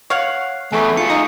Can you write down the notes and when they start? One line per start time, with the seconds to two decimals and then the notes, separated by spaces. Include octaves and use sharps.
0.10 C#5 F5 F#5 C7
0.72 E2 A3 G#5 C#6
0.97 F4 G#4 C#7
1.10 D#4 A#5